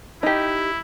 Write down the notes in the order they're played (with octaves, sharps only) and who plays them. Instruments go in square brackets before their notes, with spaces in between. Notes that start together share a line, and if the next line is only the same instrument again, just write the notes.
[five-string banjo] D#4 G4 [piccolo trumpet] E4